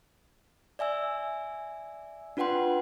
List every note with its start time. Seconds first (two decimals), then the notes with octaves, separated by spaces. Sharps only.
0.79 D5 E5 G#5 E6
2.37 D4 F4 B4 F#5 G5 C6